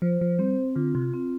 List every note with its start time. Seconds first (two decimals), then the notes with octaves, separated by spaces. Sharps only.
0.02 F3 C5
0.21 F3
0.39 G3 C4
0.76 D3 F4
0.95 C3
1.14 C4